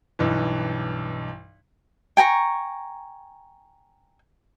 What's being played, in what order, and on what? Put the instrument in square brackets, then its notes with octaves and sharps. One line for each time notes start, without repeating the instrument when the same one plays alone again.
[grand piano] B1 G2 E3
[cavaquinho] G5 G#5 A#5 C#6